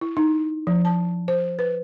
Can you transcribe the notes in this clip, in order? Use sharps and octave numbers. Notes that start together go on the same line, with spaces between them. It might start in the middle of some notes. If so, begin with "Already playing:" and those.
E4
D#4
F3
A5
C5
B4